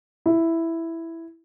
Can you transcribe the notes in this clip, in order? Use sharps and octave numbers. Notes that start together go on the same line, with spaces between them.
E4